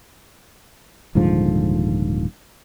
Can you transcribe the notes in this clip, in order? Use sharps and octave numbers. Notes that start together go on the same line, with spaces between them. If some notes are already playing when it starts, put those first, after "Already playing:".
D#1 G#2 D3 F3